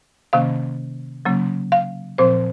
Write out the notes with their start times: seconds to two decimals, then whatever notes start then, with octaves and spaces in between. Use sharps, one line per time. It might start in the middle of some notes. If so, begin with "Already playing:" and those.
0.33 C3 D#3 A#3 C#4 F5
1.25 C#3 F#3 A#3 C#4
1.72 F5
2.18 A#2 F3 C4 C5